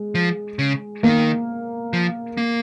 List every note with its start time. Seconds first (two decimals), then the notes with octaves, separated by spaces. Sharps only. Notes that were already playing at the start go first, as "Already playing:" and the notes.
Already playing: G#3
0.15 F3
0.59 C#3
1.03 D#3 A#3
1.93 F3
2.37 A#3